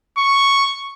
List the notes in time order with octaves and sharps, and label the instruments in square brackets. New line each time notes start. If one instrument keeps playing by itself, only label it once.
[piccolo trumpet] C#6